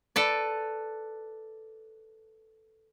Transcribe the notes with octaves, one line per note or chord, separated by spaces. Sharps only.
A4 B4 D5